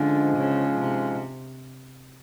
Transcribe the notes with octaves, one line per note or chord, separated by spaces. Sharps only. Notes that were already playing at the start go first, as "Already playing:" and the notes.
Already playing: G#2 D3 F3 G#3 C#4
C#3
C3